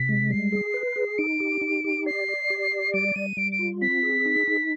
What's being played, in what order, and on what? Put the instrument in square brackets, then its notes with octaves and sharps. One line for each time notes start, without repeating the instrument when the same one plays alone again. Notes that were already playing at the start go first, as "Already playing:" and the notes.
Already playing: [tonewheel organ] C3 [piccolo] B6
[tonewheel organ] G#3
[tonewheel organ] G3 [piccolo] C7
[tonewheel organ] G#4
B4
G#4
[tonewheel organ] D#4 [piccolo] D7
[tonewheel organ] G4
D#4
G4
[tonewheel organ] D5 [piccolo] C7
[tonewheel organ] D5
G4
D5
[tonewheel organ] G3 [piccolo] D7
[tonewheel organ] G3 [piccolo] D#7
[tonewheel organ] G3 [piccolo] D7
[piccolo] D7
[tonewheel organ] F4
[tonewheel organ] C4 [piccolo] B6
[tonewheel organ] G#4
D#4
D#4